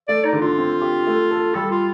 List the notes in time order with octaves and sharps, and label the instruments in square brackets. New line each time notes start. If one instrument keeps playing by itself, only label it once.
[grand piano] A3 [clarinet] D5
[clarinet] D#4
[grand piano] D3
[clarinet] F4
[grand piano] C4
G4
A3
A4
[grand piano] G3 [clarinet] A4
[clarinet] F4